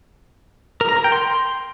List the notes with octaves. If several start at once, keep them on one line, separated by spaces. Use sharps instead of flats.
A#4
A#5
A#4
G5
C6